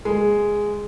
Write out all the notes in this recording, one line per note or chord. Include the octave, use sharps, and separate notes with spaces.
G#3